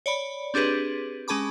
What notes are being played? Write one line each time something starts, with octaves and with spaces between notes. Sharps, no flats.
C#5 D5 B5
C4 D4 G4 G#4 B4
G#3 C#4 G#4 A5 B5 D6